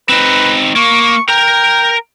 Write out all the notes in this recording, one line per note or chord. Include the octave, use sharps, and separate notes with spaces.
C4 D#4 B4
A#3 C#6
A#4 G5 A#5